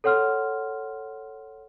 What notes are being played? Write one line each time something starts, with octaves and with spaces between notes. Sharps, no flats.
A4 C#5 F#5 C6 F6